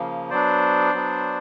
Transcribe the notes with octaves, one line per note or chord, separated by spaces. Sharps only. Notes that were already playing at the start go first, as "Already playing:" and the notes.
Already playing: C#3 F3 A#3
F#3 B3 D4 C5 D5
F#3 B3 D4